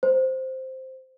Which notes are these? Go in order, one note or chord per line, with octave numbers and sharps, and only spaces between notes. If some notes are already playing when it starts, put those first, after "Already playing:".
C5